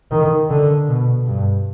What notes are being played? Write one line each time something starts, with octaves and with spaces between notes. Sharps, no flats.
D#3
D3
B2
G2